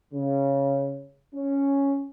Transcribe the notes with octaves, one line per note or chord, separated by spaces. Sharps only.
C#3
C#4